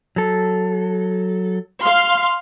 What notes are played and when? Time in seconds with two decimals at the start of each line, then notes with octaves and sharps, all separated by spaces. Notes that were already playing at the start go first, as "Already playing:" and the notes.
0.16 F#3 A4
1.83 F5 C6